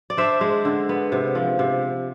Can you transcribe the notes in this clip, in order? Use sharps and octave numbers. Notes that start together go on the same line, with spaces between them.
D5
D4 C5 E5
G#3
D3
B3
C3
F3
C3